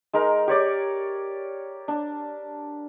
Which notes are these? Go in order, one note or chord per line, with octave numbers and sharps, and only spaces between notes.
G#3 D#4 A#4
G4 C#5 D5 D6
D4